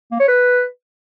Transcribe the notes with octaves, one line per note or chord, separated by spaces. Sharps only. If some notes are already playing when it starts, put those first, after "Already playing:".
A#3
C#5
B4